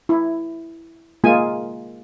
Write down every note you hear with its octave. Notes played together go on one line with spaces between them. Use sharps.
E4
G#3 A#3 F4 G#5